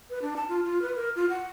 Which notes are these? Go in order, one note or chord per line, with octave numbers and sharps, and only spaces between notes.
B4
D4
A5
F4
F4
B4
A#4
F4
F#5